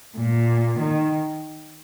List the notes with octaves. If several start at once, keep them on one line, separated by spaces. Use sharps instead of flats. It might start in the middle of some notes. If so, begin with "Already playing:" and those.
A#2
D#3